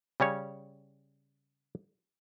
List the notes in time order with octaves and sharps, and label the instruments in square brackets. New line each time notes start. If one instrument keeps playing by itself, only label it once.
[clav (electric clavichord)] C#3 G3 C#4 C#5